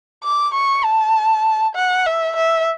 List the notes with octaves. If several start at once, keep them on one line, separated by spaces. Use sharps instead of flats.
D6
C#6
A5
F#5
E5
E5